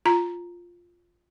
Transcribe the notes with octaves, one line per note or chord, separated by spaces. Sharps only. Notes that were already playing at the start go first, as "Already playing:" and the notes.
F4 A#5